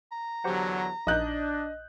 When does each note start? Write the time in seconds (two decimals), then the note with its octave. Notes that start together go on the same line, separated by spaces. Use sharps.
0.12 A#5
0.44 E2 D3 F#3 G4 C5 F#5
1.07 A#1 D4 D#4 D#5 F#6 G6